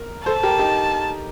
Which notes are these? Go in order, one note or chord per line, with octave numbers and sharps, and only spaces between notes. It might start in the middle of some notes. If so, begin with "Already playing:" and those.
Already playing: A#4
A4 C5 A5
G4 A#4
D#4 G4